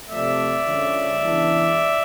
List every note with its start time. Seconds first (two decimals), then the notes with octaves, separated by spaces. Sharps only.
0.09 C3 F3 A3 D5 E5
0.66 D3 F3 G#3 C#4
1.23 C#3 E3 G#3 B3 D4